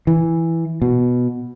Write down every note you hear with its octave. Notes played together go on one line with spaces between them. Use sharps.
E3
B2